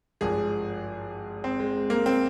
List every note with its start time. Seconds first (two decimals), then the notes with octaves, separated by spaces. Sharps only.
0.21 G#1 G2 F3 G#4
1.44 C4
1.60 G#3
1.90 A#3
2.06 C4